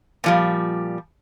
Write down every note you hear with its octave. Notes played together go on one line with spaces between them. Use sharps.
A#2 F3 G3